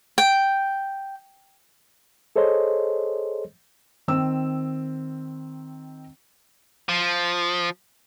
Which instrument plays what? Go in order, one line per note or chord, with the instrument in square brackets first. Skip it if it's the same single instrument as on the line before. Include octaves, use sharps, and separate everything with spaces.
[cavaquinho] G5
[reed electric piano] G#4 A4 C5 C#5 D#5 C6
[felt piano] D#3 C4 E6
[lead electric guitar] F3